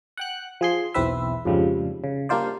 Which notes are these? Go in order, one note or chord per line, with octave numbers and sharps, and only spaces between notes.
F#5 G5 F#6
F3 G#4 C6
B1 E2 C4 B4 E5
F2 G#2 C#3 F3 G3
C#3
G3 A#3 D4 F4 C5 D5